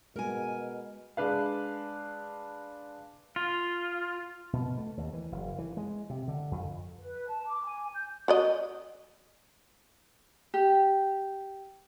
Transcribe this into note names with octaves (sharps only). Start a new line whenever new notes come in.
B2 G#3 A#4 G#5
G#3 D4 B4 F5
F4
B2
A3
D#2
E3
F#1
E3
G#3
C3
D3
F2
B4
A5
D6
G#5
G6
F#4 D5 D#5
G4